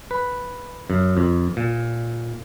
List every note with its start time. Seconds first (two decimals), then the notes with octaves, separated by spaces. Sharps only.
0.11 B4
0.90 F#2
1.17 F2
1.57 A#2